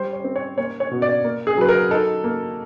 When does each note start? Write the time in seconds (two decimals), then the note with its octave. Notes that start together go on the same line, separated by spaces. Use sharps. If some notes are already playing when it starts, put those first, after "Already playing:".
Already playing: G3 C5
0.13 C#5
0.24 C4
0.36 C#5
0.58 A#3 C#5
0.80 C#5
0.91 B2
1.02 D5
1.24 A#3
1.47 G#4
1.57 F#3 B4
1.69 A#4
1.91 D#4 A4
2.24 A#3